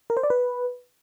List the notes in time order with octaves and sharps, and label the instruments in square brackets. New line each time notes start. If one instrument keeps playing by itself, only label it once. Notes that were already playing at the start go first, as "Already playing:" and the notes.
[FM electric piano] A#4
C5
D5
B4